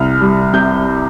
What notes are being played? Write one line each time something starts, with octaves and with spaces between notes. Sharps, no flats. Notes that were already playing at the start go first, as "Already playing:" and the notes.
Already playing: C2 F6
G3
C3 G6